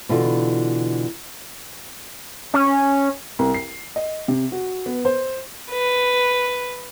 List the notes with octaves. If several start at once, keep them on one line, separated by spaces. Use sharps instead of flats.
B2 D3 E3 F4
C#4
C2
C7
D#5
C3
F#4
B3
C5
B4